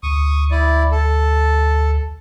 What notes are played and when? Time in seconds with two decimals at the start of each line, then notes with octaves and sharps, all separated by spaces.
0.03 D2 C#6 D#6
0.51 E4 D5
0.92 A4